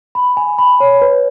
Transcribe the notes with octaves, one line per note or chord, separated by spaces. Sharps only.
B5
G#5
B5
C#5
B4